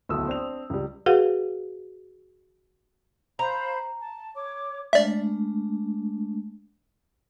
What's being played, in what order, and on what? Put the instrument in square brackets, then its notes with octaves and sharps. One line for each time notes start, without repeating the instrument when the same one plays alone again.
[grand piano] D1 B1 E4 A4 D#6 E6
C4 D4 F7
C#2 G3
[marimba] F#4 G#4 B4 F5 F#5
[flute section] C5 F5 B5 [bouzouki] A#5
[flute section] A5
C#5 D6
[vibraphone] G#3 A3 D4 [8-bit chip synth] D5 E5